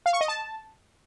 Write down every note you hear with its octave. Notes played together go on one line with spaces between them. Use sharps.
F5
C#6
D#5
A5